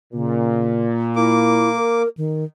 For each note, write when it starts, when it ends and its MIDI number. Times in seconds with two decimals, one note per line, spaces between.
0.13 1.75 46
0.13 0.85 49
1.16 2.02 58
1.16 1.70 64
1.16 2.02 86
1.77 2.08 70
2.17 2.44 51